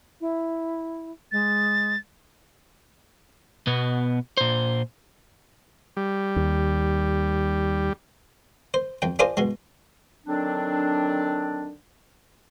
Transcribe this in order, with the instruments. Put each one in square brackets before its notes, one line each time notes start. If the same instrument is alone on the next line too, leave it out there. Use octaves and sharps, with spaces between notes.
[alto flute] E4
[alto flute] G#3 [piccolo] A6
[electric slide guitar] B2 B3
A#2 C5
[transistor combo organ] G3
[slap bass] D#2
[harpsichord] C5
F2 G5
D4 F4 G#4 A#4 C5 D5
B2 G#3
[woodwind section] D3 D#3 F#3 C4 D4